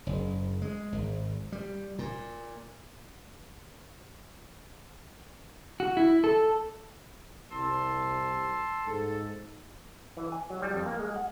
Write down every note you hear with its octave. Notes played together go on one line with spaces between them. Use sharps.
F#1
G#3
G#1
G3
A#2
F#4
E4
A4
C2 A5 C6 E6
G#2 A4
E3
G#5
F#3
G3
F2
A#3
G#3
F#5